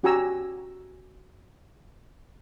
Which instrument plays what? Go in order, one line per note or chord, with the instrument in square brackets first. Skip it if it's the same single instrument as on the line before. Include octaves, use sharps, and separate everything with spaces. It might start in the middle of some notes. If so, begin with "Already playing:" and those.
[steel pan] C#4 F#4 G4 G#5 A#5 E6